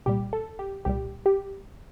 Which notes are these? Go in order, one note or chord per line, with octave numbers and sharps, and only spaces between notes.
C2 A#2 G3 G4
A4
G4
C2 A#2 G3 G4
G4